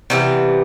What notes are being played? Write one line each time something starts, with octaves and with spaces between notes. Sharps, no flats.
C3 E3 G3 B3